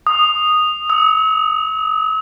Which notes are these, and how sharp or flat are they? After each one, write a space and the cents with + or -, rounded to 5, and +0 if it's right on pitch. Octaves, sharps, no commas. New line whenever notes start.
D#6 -10
E6 -45